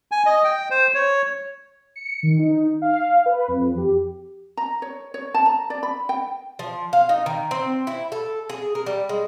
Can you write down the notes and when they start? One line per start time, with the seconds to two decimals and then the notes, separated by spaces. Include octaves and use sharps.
0.11 G#5
0.26 D#5
0.44 G5
0.71 C5
0.94 C#5
1.96 C#7
2.23 D#3
2.39 D#4
2.82 F5
3.26 B4
3.48 F2
3.77 G4
4.57 A#5
4.82 C#5
5.14 C#5
5.34 A5
5.46 A#5
5.70 D5
5.83 B5
6.09 G5
6.59 F3
6.93 F5
7.09 D#4
7.26 D#3
7.51 C4
7.87 E4
8.12 A4
8.49 G#4
8.75 A#4
8.86 G3
9.09 G#3